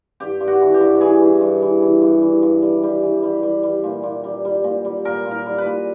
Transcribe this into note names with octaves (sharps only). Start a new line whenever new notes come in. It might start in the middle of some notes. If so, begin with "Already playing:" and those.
G2 G4
G2
F#4
E3
G4
G2
E3 G#4
E3
G2
E3
E3
G2
E3
G2
G3
G3
E3
G3
G3
G3
A#2
A#2
G3
G3
A#2
G3
A#2 A#4
A#2
A#4
G3
B4
A#2